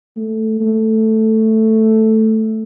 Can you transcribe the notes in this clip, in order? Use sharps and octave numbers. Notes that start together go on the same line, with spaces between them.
A3
A3